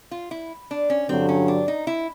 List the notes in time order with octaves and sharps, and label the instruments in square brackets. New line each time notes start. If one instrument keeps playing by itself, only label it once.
[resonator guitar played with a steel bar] F4
E4
D4
C#4
[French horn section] G2 D3 F#3 [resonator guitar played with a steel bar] C4
[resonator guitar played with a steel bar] C#4
D4
D#4
E4